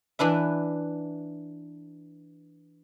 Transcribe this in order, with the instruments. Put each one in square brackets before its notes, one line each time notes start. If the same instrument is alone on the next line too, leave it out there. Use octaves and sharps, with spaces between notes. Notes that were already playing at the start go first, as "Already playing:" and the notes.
[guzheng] E3 D4 B4 E5